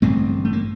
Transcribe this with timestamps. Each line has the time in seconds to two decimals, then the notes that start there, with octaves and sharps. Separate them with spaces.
0.02 A1 G2 D3 A3 C4
0.45 A3
0.53 A#3